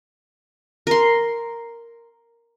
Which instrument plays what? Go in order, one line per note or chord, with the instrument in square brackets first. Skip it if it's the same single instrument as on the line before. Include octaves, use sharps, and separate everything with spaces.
[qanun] A#4 C6